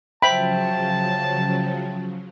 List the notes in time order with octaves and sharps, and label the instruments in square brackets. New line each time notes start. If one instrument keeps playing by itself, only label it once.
[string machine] C#3 F3 F#3 [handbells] C5 E5 G5 [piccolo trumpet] A5 [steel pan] B5